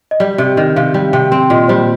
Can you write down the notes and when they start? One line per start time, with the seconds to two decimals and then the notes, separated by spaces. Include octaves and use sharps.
0.11 D#5
0.20 G3 D5
0.38 C3
0.57 D#3
0.76 C3 F5
0.94 G3 G5
1.13 C3 G5
1.31 C4 G5
1.50 A#2 D#5
1.68 G3 C5